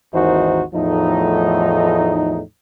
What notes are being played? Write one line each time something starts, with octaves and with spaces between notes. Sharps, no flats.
G#1 D#2 E3 D#4 F#4 C5
E2 A2 F3 A3 D#4